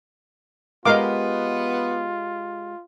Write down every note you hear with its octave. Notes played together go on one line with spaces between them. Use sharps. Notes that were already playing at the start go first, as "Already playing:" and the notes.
G#3 B3 F4 G4 A#4 D#5 F5 D6